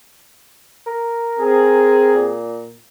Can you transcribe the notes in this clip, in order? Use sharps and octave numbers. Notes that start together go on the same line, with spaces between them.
A#4
C4 G#4
A#2